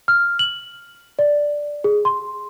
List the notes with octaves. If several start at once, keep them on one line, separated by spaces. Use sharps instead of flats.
F6
F#7
D5
G#4
C6